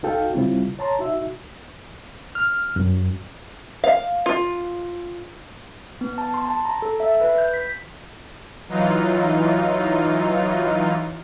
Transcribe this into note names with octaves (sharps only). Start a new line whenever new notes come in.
C#2 D#4 F#4 A4 F5 G5
C#3 G3 C4 E4 F4
C#5 A5 A#5 C6
D#4 F#4 E5
F6
F#2
F5
F4
B3
A5
C6
A5
A#5
A4
E5
B4
G6
B6
E3 F#3 D#4 F4